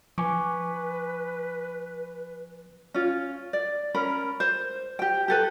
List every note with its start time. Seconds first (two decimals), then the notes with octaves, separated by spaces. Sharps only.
0.18 F3 B4 G#5 C#6 D6
2.94 C#4 F4
3.53 D5
3.94 C#4 A#4 B5
4.40 C5
4.99 G4 G5
5.28 G4 A4 B4